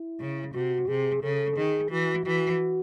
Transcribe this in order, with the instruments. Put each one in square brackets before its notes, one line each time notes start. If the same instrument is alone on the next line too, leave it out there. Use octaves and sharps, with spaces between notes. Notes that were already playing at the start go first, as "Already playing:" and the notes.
Already playing: [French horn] E4
[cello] C#3
[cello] C3 [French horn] F#4
[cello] C3 [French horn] G#4
[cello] C#3 [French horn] A4
[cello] D#3 [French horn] G#4
[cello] E3 [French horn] F#4
[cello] E3 [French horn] F#4